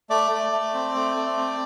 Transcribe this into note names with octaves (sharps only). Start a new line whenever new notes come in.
A3 D5
A3
A3
C4
A3
A3
C4